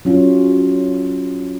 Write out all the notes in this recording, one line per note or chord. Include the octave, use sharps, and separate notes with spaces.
F#3 C#4 F4